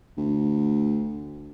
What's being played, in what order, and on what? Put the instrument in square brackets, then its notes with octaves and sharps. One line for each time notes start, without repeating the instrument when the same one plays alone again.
[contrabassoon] D2